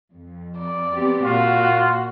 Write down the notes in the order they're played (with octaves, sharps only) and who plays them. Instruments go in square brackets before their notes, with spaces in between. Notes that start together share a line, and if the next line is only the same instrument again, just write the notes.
[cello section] F2
[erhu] D5
[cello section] B3 C4 G4
[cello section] A#2 [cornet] F4 [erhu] F#4